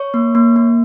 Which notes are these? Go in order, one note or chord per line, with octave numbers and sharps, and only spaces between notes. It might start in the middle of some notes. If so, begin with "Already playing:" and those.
Already playing: C#5 C#6
A#3
A#3
A#3